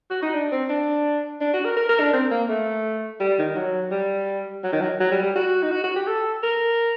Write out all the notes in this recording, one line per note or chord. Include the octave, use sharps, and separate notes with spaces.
F#4
D#4
D4
C4
D4
D4
F#4
A#4
A#4
A#4
D4
C4
A#3
A3
G3
D#3
F#3
G3
F#3
D#3
F#3
F#3
G3
G3
F#4
D#4
F#4
F#4
G4
A4
A#4